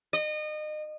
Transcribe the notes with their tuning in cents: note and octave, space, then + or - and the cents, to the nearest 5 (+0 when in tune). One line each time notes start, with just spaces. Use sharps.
D#5 -30